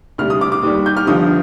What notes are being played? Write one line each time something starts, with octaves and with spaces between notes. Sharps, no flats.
D2 C3 G3 F6
D#6
D6
D6
D#2 D#3 G3
G6
F6
G1 G2 D3 F3 D#6